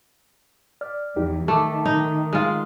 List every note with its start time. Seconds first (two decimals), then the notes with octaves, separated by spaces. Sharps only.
0.81 D5 F6
1.16 E2 D#4 G4
1.48 D#3 A3 A5 D6
1.86 D#4
2.33 G#3 F4